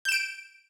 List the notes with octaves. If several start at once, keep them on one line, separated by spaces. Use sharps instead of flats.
G6 D7 E7